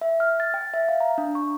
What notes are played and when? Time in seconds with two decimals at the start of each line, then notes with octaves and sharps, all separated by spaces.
0.01 E5
0.20 F6
0.40 A6
0.54 G5
0.74 E5
0.89 F5
1.00 A#5
1.18 D4
1.35 C#6